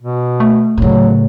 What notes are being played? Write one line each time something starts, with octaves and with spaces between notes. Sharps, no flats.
B2
A3
A2 C#3 F#3